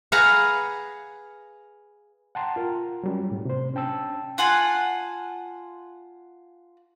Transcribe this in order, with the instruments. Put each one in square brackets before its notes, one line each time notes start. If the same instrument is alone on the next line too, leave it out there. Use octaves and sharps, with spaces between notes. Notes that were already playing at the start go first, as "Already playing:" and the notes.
[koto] G#4 B4 F5 F#5 A#5
[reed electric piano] F#5 G5 A5 A#5 C6
F4 A#4
F#3 G3 C#4
A2
C3 C5
C#4 D4 G5 A5 E6
[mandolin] F4 F#5 G#5 A5